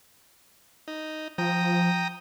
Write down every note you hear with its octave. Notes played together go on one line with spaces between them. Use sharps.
D#4
F3 G5 A#5 D#6